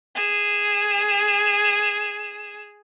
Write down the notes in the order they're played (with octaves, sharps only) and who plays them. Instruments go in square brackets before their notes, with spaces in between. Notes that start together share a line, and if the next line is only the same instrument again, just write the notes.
[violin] G#4 E7